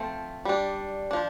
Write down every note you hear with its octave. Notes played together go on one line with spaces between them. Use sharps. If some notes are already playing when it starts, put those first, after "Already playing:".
Already playing: F3 A3 C4
G3 D4
F3 D4